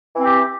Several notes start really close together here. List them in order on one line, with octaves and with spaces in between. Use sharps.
E3 C4 G4